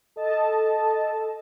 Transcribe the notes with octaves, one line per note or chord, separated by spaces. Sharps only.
A4 D#5 A5